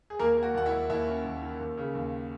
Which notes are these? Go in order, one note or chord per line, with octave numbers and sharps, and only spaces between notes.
G#4
D#2 A#3 A#4
A#3
F#4
D#2 F#5
E4 E5
D#2
D#2 E4 E5
C#4
D#2
D#3
D#2
C#3
D#2